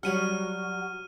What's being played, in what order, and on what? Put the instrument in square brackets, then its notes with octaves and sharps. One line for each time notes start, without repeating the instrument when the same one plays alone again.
[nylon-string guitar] F#3 G3 F#5 [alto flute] F#4 [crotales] F6 D#7